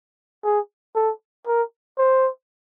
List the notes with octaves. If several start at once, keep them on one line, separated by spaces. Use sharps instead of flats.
G#4
A4
A#4
C5